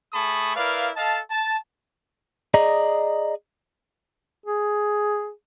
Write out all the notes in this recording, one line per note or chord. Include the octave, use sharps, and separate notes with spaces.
A3 G#4 A5 B5 C#6 D#6
E4 A#4 B4 D5 F5
A4 D#5 F5 A5
A5
G#4 D5 D#5 A#5
G#4